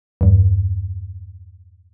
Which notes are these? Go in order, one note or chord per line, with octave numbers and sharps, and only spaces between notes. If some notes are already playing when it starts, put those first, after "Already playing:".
E2 G2